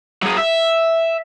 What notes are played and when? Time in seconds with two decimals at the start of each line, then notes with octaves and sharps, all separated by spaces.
0.22 F#3 G#4
0.37 E5